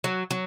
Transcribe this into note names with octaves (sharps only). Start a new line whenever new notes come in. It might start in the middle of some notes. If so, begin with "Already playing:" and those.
F#3
F#3